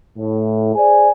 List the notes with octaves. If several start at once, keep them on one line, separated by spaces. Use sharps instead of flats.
A2
G#4 C5 D5 G#5